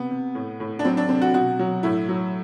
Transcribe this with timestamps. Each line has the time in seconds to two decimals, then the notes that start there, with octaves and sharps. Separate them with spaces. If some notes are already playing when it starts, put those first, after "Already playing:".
Already playing: C3 B3
0.11 C3
0.35 A2
0.60 A2
0.79 D4
0.85 F#3 C4
0.97 D4
1.09 C3 C4
1.21 F#4
1.34 B2 F#4
1.59 F#3
1.83 A2 E4
2.09 F#3